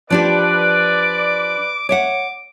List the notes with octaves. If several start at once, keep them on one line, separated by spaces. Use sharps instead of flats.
F3 D4 G4 B4 D5 D6
C#5 E5 F#5 D6